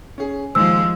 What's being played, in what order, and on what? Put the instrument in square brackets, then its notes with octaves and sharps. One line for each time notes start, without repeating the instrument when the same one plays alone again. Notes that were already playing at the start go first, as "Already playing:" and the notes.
[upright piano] C#4 G#4
[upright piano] D#2 C5 [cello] F3 G#3 [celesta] E6